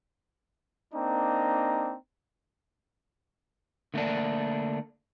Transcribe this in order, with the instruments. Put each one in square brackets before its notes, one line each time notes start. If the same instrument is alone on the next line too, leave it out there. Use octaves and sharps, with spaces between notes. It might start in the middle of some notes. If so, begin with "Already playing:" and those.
[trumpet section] A#3 C4 D4 D#4 A#5
[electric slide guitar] D3 A3 A#3 D4